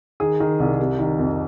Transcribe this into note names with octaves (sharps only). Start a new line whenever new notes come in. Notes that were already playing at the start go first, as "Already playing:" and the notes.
D#3 G#4
D#3
C2
C3
D#3
F2